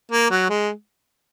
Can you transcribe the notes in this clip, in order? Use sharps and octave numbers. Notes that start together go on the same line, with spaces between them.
A#3
F#3
G#3